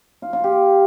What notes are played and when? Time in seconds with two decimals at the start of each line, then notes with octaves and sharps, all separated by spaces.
0.22 F4
0.33 F4
0.44 G4